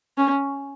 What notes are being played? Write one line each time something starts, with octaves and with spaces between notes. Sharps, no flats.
C#4